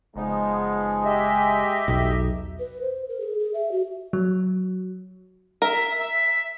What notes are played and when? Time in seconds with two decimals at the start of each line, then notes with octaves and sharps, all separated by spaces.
0.16 F#1 F3 G#3 B3 D#4
1.05 G4 D#5 E5
1.88 B1 E2
2.59 B4
2.81 C5
3.09 A#4
3.20 G#4
3.40 G#4
3.54 E5
3.72 F#4
4.13 F#3
5.62 A#4 E5
5.98 E5